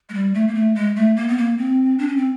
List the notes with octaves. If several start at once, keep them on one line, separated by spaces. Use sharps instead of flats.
G#3
G3
A3
A#3
A3
G#3
A3
A#3
B3
A#3
C4
D4
C#4
C4